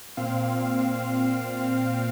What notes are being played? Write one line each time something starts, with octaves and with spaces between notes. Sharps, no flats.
A#2 C4 F5